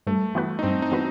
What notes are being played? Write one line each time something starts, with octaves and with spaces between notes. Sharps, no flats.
G2 A3
E3 B3 F#4 B4
D#4
G2 C4
D#4
E3 B3 F#4 B4